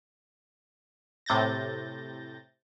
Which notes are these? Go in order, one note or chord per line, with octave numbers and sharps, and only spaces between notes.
A2 C3 G6 A6 A#6